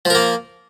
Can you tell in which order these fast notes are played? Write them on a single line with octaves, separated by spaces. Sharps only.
F3 A#4 A#3